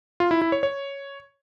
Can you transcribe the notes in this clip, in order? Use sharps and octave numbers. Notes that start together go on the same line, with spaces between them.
F4
E4
E4
C#5
C#5